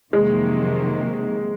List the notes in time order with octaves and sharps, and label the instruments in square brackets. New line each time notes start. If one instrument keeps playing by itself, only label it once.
[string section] F2 C3 D#3 F#3 A#3 [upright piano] G#3